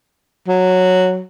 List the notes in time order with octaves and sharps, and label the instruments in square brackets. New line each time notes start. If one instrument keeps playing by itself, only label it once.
[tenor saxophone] F#3